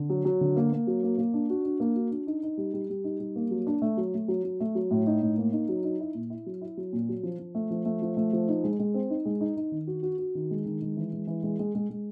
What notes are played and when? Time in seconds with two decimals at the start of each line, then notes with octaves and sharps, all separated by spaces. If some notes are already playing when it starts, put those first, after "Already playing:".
Already playing: D3
0.10 F#3
0.25 F#3
0.41 D3
0.56 A#3
0.72 A#3
0.87 F#3
1.03 A#3
1.18 A#3
1.34 D4
1.50 F#4
1.65 D4
1.80 A#3
1.96 F#4
2.11 D4
2.27 D#4
2.43 D#4
2.58 G3
2.74 G3
2.90 G3
3.04 D#4
3.20 G3
3.36 A#3
3.51 F#3
3.67 D4
3.82 A3
3.97 F#3
4.14 A3
4.28 F#3
4.44 F#3
4.60 A3
4.75 F#3
4.91 A2
5.07 D#4
5.22 A2
5.38 A#3
5.53 D#4
5.69 F#3
5.84 D#4
6.00 E4
6.15 A#2
6.30 E4
6.46 F#3
6.61 E4
6.77 F#3
6.93 A#2
7.09 F#3
7.23 F3
7.39 F3
7.55 A3
7.71 F3
7.85 A3
8.02 F3
8.17 A3
8.33 F3
8.49 D#4
8.64 G#3
8.79 G#3
8.94 C4
9.10 D#4
9.25 G#3
9.41 D#4
9.57 D#4
9.72 D#3
9.87 F#4
10.03 F#4
10.18 F#4
10.35 D#3
10.51 G#3
10.66 D#3
10.81 G#3
10.97 E3
11.13 G#3
11.27 E3
11.43 G#3
11.59 G#3
11.75 G#3
11.89 G#3